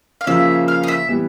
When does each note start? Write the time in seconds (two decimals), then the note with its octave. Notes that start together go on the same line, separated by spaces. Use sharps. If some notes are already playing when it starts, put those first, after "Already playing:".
0.21 F5
0.27 C#3 F3 A#3 C#4 F4 E5
0.68 F5
0.83 D#5
0.88 E5
1.09 E3 G3 B3